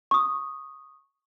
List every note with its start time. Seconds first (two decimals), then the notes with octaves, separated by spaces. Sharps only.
0.11 C#6 D#6